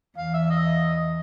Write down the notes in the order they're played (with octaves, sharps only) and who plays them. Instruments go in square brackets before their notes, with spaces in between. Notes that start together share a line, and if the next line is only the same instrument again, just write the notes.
[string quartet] E2 [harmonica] F5
[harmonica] E5
D#5